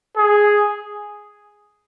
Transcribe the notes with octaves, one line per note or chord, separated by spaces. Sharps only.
G#4